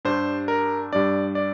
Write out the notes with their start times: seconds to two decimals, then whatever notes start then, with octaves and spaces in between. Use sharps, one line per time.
0.05 G2 G3 D4 C5
0.48 A#4
0.93 G2 G3 D4 D5
1.35 D5